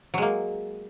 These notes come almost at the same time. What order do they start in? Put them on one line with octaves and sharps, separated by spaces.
F#3 G#3 A#3